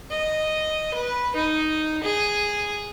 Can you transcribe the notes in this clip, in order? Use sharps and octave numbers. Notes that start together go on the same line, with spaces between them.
D#5
B4
D#4
G#4